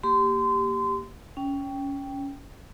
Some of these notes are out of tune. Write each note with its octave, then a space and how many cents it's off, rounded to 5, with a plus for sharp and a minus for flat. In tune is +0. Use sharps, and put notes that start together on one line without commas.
A#3 +0 G4 +0 C6 -30
C#4 +10 G5 +0